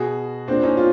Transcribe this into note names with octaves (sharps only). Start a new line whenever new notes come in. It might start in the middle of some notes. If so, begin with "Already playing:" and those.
Already playing: B2 F#4 G#4
A#2 C4 D4
C#4 D#4
F4